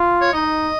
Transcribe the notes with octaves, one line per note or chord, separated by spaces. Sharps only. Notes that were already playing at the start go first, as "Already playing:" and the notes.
Already playing: F4
C#5
D#4 D#5